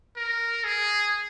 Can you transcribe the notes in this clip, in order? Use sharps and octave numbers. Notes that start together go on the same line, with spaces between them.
A#4
G#4